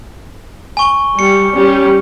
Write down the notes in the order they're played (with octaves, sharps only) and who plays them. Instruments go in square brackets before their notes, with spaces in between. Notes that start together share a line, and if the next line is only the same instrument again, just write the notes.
[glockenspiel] G#5 C#6 G7
[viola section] G3 [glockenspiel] C#7
[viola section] G3 C#4 G4